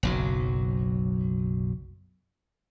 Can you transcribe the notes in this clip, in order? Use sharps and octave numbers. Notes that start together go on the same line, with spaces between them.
F#1 B1 F#3